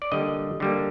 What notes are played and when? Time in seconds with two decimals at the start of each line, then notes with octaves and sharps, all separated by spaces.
0.02 D5
0.12 D3 G3 A#3 D#5
0.60 D3 G3 A#3